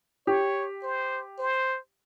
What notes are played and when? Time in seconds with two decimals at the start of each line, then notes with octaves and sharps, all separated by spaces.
0.27 G4 C#5
0.83 C5
1.39 C5